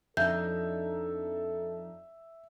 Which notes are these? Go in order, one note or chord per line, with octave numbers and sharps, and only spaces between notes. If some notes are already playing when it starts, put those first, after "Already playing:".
F2 D4 D#4 A4 E5 G6